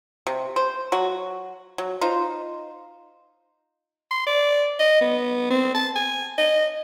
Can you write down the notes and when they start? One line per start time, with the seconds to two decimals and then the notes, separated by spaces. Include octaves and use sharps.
0.27 C3
0.56 C5
0.92 F#3 F#4
1.78 F#3
2.01 D#4 F4 C5
4.11 C6
4.26 D5
4.79 D#5
5.01 B3
5.50 C4
5.74 A5
5.95 G#5
6.38 D#5